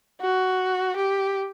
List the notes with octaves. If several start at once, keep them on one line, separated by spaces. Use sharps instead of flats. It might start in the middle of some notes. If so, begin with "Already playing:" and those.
F#4
G4